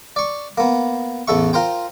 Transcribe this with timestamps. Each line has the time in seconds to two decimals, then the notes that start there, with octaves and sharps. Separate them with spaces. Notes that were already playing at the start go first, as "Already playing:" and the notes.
0.16 D5 C#6
0.58 A#3 B3
1.28 A1 E2 A4 E5 C#6
1.53 F4 A#4 C5 G5